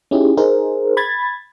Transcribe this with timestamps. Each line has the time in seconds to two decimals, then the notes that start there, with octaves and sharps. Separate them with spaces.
0.11 C#4 D#4 E4 G4 G#4
0.37 D#4 G#4 A#4 C5
0.97 B5 G#6 A6